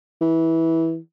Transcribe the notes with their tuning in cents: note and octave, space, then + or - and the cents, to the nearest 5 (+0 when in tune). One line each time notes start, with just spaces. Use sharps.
E3 -15